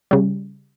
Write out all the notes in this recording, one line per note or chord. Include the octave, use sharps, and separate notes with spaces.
C#3 G3